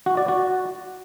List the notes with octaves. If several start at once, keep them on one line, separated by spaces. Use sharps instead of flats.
F#4
D5
F#4